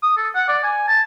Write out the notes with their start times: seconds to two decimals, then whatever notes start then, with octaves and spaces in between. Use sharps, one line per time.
0.03 D#6
0.17 A4
0.35 F#5
0.48 D5
0.64 G#5
0.88 A5